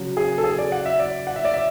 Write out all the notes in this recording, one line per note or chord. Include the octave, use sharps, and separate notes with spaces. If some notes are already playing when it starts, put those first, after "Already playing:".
Already playing: C#3 F#3
G#4
A4
G#4
D5
F#5
E5
D5
F#5
E5
D5
E5